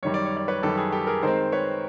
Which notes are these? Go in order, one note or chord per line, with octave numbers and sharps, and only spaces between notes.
F#2 D#3 G3 C#5
D5
C#5
D5
B4 C#5
F#2 D#3 G3 G4 A4
G#4
G4 A4
G#4 A#4
D#3 G#3 C4 A#4 C5
B4 C#5